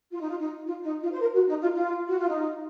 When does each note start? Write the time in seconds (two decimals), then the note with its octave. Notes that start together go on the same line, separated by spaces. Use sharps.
0.12 F4
0.20 D#4
0.29 F4
0.39 D#4
0.66 F4
0.84 D#4
1.02 F4
1.13 C5
1.20 A#4
1.34 F#4
1.48 D#4
1.61 F4
1.74 F4
2.08 F#4
2.19 F4
2.28 D#4